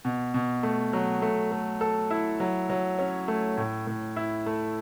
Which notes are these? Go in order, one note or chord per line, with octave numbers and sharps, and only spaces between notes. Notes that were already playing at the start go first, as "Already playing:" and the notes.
B2
B2
A3
F#3
A3
A3
A4
E4
F#3
F#3
C#4
A3
A2
A2
E4
A3